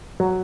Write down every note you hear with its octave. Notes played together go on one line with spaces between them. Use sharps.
F#3